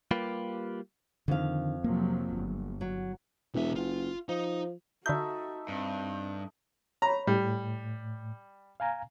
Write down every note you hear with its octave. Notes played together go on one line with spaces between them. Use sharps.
G3 A#3 F4 G4 B4
F2 D3 D#3 F5
C3 F3 F#3 A#3
G1
F#3
E1 B1 E5
F#1 F4
F3 D#4
D3 A3 D#4 F#4 E5 G6
G2 C4
C#5 A#5 B5
A2 G3
F5 G#5 A#5